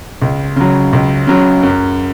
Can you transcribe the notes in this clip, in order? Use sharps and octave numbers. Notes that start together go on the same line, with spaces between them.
C#2
C#3 F#3
C#2
C#3 F#3
F#2